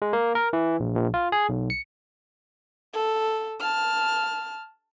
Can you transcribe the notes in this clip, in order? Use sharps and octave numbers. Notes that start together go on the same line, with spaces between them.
G#3
A#3
A#4
E3
A#1
A#1
F4
G#4
B1
C#7
A4
A5 F6